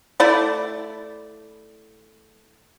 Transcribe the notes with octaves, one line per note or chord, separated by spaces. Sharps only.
A3 E4 D5